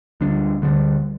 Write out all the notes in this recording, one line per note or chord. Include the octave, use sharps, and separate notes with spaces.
D2 D3 G3 D4
D2 D3 G3